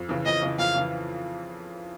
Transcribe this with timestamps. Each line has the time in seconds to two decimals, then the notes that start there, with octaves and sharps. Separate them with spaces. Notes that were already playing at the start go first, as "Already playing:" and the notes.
Already playing: F2
0.09 C#3 E3
0.26 F2 D#5
0.42 C#3 E3
0.59 F2 F5
0.75 C#3 E3